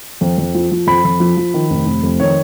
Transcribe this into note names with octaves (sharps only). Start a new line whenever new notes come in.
F2
F2
F3
F3
F2 B5
F2
F3
F3
D#3
F1
F1
F2
D#3 C#5